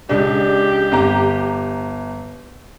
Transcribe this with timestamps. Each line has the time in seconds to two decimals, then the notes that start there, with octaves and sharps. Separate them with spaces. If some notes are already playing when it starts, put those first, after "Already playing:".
0.09 C#2 D4 G4
0.92 G1 A#5